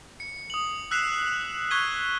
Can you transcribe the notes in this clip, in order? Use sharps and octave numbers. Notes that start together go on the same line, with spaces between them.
C#7
D#6 F#7
E6 F#6 B6 C7 E7 F7
C#6 F#6 G#6 B6 D#7 G7